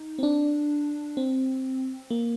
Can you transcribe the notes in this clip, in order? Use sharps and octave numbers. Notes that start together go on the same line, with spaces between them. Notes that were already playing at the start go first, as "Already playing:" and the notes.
Already playing: D#4
C4
D4
C4
A#3